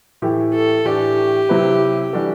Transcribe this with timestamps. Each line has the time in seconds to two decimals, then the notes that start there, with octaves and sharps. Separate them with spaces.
0.22 A2 E3 A3 E4 G4
0.54 A4
0.85 A2 E3 A3 D4 G4
1.49 C3 F#3 C4 E4 B4
2.13 E3 G3 D4 F#4 A4